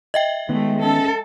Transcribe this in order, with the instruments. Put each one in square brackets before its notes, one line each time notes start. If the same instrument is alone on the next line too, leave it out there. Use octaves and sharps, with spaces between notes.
[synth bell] D#5 E5 G5
[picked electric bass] D#3 B3 [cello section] G#3 A3
[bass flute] C#4 [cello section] A4